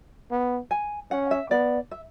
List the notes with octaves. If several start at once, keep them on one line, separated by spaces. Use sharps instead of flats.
B3
G#5
C#4 F#5
E5
B3 D5
E5